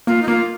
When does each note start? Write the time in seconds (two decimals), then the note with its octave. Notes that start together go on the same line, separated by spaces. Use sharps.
0.07 A#3 F4
0.22 D#4
0.28 A#3 F4